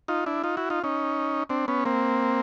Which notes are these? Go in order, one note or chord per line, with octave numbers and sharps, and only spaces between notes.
D#4 F4
D4 E4
D#4 F4
E4 F#4
D#4 F4
C#4 D#4
C4 D4
B3 C#4
A#3 C4